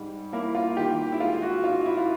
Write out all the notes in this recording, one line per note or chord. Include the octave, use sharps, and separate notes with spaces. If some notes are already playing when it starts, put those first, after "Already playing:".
Already playing: G#2 G3
A#3 E4
F4
D#3 G4
E4
G#3 F4
F#4
G#2 F4
E4
F4